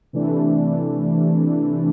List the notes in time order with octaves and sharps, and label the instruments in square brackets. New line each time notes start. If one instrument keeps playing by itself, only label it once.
[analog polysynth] C3 E3 A3 D4